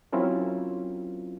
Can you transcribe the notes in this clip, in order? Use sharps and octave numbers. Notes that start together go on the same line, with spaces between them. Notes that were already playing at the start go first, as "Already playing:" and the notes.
F#3 C4 C#4 E4 F4 A#4